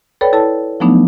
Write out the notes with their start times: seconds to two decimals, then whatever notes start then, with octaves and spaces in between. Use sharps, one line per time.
0.21 A4 B4 C#5 D5 G5 B5
0.33 E4 A4 C#5 A5
0.80 F3 F#3 A3 B3 D4 D#4